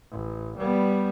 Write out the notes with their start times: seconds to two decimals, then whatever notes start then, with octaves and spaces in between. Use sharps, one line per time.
0.12 A1
0.58 G3 B3